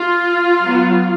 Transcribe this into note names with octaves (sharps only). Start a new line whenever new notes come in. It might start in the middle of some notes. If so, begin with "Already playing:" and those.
Already playing: F4
F#3 B3